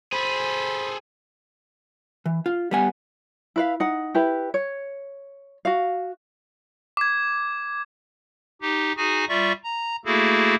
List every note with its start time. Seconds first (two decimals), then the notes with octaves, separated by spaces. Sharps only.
0.12 G#4 A4 C5 B5
2.25 E3
2.46 F4
2.71 G3 B3 G#5
3.56 E4 B4 F5
3.80 D#4 F#5
4.14 E4 G4 B4
4.54 C#5
5.65 F#4 F5
6.97 D6 G#6
8.61 D#4 G4
8.97 D#4 F#4 G#4 G#5
9.29 G3 F4 D5 E5 C#6
9.64 A#5
10.05 A3 A#3 E4 F#4 G#4 A4